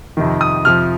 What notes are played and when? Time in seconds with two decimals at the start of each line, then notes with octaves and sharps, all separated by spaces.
0.17 F2 C3 D#3
0.41 D#6
0.65 F2 C3 F3 F6